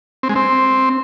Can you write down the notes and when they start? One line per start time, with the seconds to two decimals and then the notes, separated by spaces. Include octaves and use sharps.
0.23 C4
0.29 G#3
0.35 C4